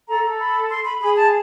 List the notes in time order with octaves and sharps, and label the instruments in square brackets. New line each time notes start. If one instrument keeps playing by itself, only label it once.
[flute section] A4 [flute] A#5
[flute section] A4
[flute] B5
C6
B5
[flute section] G#4 [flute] B5
[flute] A5